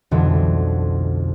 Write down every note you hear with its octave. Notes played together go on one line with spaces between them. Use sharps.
B1 F2 B2 D3 E3 G3